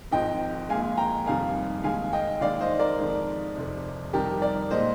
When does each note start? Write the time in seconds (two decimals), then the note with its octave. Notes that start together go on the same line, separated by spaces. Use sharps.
0.11 G#1 G#2 F3 G#3 D#5 G5
0.69 A#1 A#2 G#3 F5 G#5
0.97 G5 A#5
1.26 F1 F2 D#3 G3 F5 G#5
1.83 D#2 D#3 G#3 F5 G#5
2.13 D#5 G5
2.41 D#2 D#3 G#3 D5 F5
2.61 C5 D#5
2.79 A#4 D5
2.99 F2 D#3 G#3
3.56 F1 F2 C3
4.13 F2 C3 D#3 G3 G4 A#4
4.42 A#4 D5
4.71 A#2 G#3 C5 D#5